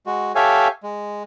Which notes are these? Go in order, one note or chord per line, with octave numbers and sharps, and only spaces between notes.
G#3 F#4
G4 A4 C#5 E5 F5 G#5
G#3